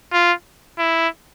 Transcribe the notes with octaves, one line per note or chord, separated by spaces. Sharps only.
F4
E4